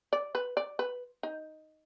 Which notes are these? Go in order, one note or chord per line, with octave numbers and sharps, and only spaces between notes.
D5
B4
D5
B4
D#4